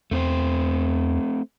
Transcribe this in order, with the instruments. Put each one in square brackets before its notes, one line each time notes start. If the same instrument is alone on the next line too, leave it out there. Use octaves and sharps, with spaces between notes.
[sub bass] E2 [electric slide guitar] A3 C4 C5